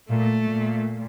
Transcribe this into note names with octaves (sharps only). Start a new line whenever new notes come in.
A#2 A3
A#2